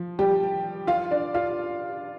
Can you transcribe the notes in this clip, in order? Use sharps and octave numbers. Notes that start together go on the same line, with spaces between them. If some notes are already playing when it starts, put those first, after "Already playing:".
Already playing: F3
G3 G4
F4 F5
D4 D5
F4 F5